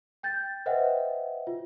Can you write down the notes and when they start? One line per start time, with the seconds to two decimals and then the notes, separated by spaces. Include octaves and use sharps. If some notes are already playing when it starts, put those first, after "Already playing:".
0.23 G5 G6 A6
0.66 B4 C5 D#5 E5 F#5 G5
1.47 F4